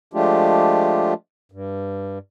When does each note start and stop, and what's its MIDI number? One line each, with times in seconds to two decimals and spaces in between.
0.14 1.14 53
0.14 1.14 56
0.14 1.14 57
0.14 1.14 62
0.14 1.14 65
0.14 1.14 67
1.52 2.18 43